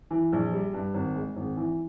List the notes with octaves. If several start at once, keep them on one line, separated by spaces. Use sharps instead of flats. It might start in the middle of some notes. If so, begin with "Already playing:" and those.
E3
A#1
G3
G2
G#1
G#3
G#1
E3